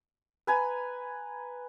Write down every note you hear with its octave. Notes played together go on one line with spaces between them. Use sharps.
B4 G#5 A#5